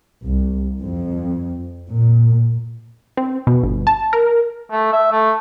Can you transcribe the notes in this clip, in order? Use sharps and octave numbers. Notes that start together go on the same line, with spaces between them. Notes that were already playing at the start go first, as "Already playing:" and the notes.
C2
F2
A#2
C4
B2
G1
A5
A#4
A3
E5
A3